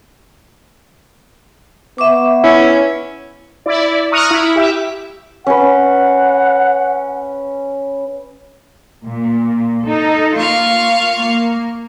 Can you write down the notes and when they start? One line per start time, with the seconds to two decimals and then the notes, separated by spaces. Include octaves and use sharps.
1.98 B3 E5 C#6 D6
2.44 C#4 E4 E6
3.66 E4 D5
4.12 A#5 C#6 D#6 F6 F#6
4.31 E4
4.56 G4 E5
5.46 C#4 B4 F#5
9.07 A#2
9.86 D#4 A4
10.38 A#3 F4 F5 C#6
11.22 A#3